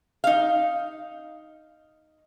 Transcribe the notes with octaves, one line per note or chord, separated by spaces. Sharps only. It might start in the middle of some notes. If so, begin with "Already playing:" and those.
D#4 F5